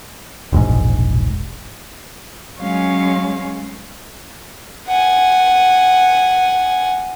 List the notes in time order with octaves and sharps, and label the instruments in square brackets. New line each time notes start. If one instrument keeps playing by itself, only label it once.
[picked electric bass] E1 A#1 G#2
[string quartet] F#3 F5 [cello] G#3 C#4
[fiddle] F#5 G#5